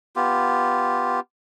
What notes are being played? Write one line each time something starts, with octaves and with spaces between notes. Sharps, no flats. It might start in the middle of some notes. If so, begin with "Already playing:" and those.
B3 F4 G4